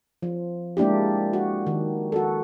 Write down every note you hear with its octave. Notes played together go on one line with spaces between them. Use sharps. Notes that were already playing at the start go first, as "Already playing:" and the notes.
F3
G#3 A#3 D4 E4 G4
F#4
D#3
F#4 A4